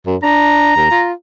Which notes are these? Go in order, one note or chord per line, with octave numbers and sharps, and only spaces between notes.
F#2
D4 A#5
D#2
F4